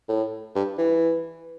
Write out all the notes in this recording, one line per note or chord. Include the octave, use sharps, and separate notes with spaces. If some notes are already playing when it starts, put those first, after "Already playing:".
A2
G2
E3